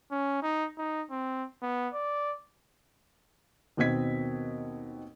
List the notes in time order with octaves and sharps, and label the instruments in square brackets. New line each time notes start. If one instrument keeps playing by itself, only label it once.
[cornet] C#4
D#4
D#4
C4
B3
D5
[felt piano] D#2 B2 C4 D#5 G#6 B6